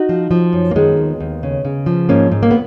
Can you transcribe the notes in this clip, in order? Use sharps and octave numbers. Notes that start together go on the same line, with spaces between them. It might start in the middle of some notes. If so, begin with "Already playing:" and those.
Already playing: D#4 F#4
F3
F3
F#2
A#3
D#3 G#3 B3
D#2
D#2
C#3
C#3
F3
G#2 A#3 C#4
G#2
A#3
B3